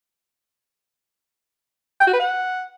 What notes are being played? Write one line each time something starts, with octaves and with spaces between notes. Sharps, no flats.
G5
F#4
B4
F#5